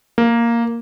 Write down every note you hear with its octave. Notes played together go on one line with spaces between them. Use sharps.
A#3